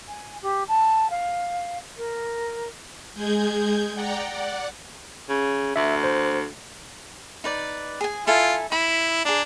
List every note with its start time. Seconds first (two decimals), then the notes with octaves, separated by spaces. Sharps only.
0.08 G#5
0.42 G4
0.68 A5
1.10 F5
1.97 A#4
3.14 G#3 G#4 G6 G#6
3.94 D5 F#5 G5 A#5
4.29 D5 F#5
5.29 C#3
5.76 D2 E5
6.04 C5
7.44 D#4 B4 D5
8.01 G#4 G#5
8.27 E4 F4 A4 G#5
8.72 E4 B5
9.25 D4 G#4 A#5